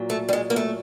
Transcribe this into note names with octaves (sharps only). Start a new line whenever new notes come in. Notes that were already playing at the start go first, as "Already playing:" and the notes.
Already playing: A#2 F#3
A3
G3
G#3
A#3
A3